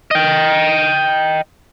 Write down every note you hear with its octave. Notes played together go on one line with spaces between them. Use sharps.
D#5 G5